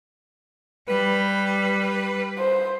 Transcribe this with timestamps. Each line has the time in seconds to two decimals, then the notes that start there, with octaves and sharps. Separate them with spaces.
0.89 G3 B4
2.38 C5